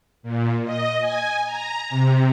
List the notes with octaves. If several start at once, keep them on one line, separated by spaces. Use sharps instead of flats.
A#2
D#5
G#5
A#5
C3